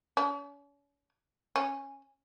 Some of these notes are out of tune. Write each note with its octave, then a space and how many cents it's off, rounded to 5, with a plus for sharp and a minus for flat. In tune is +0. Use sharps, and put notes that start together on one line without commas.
C#4 +40
C#4 -10